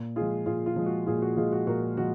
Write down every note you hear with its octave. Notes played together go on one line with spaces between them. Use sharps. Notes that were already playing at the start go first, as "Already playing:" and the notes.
Already playing: A#2
G#3 F4 G#4
F3
A#2 F4 G#4
F4
F3 G#3
F#4
A#2 F4 G#4
F#4
F3 G#3 F4 G#4
F#4
A#2 F#4 A#4
F3 G#3 F#4